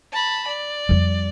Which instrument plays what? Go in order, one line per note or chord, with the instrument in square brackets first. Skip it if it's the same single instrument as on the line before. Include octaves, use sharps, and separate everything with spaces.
[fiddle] A5 B5
D5
[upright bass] F2 G3